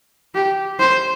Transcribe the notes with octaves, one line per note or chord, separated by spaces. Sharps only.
G4
C5